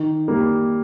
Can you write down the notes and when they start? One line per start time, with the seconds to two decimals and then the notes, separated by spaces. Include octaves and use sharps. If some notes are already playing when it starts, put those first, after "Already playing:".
Already playing: D#3
0.28 G3 A#3